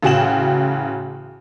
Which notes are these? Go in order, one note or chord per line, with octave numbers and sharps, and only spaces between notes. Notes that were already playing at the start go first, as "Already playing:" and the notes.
A1 C#3 F#4 G5 E7 F#7